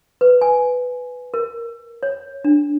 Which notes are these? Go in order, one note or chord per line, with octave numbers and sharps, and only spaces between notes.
B4
G#5
A#4
C#5
D4